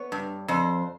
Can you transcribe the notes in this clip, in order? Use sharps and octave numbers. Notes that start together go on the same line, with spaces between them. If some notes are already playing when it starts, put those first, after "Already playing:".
Already playing: B3 C#5
G2
F2 C5